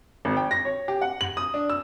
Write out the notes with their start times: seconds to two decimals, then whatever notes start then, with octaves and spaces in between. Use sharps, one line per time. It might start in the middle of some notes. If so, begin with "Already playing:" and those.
0.25 G#1
0.37 G5
0.51 A#6
0.65 C#5
0.88 G4
1.02 F#5
1.21 F#7
1.37 D#6
1.54 D4
1.70 E6